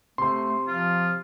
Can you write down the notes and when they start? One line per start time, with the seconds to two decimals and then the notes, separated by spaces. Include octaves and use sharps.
0.18 C3 A3 C6
0.68 F3 F4